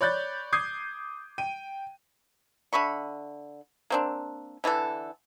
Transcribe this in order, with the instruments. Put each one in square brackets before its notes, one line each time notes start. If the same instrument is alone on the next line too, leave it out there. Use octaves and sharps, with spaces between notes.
[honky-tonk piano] C#5 D5 B5 F#6 G6 A6
D6 D#6 G6 G#6 C7
G5 D#7
[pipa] D3 E5 B5 C#6
A#3 C4 D4
D3 E3 G4 A4